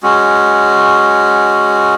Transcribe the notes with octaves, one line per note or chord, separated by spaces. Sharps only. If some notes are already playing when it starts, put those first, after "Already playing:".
G#3 C#4 F#4